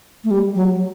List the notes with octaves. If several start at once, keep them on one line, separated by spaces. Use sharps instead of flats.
A3
G3
F#3